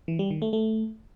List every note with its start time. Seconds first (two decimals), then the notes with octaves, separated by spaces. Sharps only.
0.08 E3
0.19 G3
0.30 D#3
0.42 A3
0.53 A3